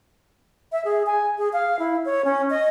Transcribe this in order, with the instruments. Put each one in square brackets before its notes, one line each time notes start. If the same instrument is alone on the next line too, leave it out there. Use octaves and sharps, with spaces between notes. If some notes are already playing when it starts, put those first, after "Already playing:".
[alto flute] E5
G#4
G#5
G#4
F5
E4
C#5
C#4
D#5